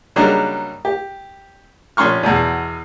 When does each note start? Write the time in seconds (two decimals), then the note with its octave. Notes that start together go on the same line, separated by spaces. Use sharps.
0.16 C#3 F#3 G3 A#3 D4 D#4
0.85 G4
1.97 A#1 C#4 C6 C#6 F6
2.23 E2 B2